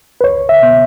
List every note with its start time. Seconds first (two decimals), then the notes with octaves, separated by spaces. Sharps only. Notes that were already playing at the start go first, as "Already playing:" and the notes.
0.21 B4
0.24 C#2 C#5
0.49 E5
0.62 B2 B3